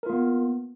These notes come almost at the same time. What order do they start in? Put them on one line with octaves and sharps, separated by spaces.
A#4 F4 A#3 B3